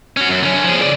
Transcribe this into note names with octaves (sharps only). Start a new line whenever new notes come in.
C#4 F#4
F#2
D3 C#4
F3 G#4
C#3 D5